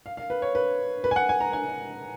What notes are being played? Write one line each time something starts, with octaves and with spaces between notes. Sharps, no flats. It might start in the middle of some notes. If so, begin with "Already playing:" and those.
F5
F5
B4
C#5
B4
B4
G#5
F#5
G#5
A#5
G#5